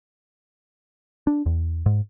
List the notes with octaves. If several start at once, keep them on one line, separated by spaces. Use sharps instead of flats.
D4
E2
G#2